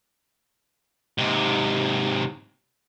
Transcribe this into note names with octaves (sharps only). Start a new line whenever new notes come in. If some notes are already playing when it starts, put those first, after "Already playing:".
G#2 C3